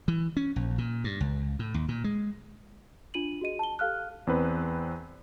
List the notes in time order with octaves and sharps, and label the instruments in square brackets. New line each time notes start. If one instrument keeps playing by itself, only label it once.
[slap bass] E3
C#4
A#1
A#2
G2
C#2
A2
D#2
A#2
G#3
[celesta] D4 F4 D#7 F#7
F#4 G#4 D#5 D#7
A5 G7
G4 A4 F5 F6 F#6
[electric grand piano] E2 C4 B4